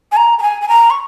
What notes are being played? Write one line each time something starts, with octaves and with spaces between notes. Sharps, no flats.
G#5
A#5
A#5
G#5
G#5
A#5
C#6